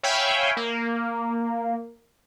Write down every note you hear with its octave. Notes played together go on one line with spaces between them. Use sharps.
C#5 E5 F5 G5 G#5 B5
A#3